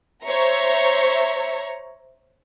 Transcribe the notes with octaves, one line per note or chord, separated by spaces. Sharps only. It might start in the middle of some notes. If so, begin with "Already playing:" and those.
C5 C#5 E5 A#5 C#6